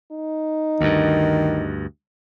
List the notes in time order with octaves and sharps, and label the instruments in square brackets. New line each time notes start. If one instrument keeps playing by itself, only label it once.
[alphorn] D#4
[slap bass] D2 G2 [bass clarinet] D#3